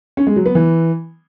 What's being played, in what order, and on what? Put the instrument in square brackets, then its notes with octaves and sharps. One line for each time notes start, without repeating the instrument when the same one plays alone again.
[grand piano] C#4
G#3
F#3
B3
E3